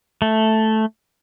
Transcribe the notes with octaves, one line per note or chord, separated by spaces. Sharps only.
A3